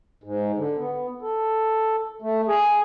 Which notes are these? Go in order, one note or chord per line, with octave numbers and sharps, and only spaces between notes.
G#2
D3
B3
A4
A3
G#4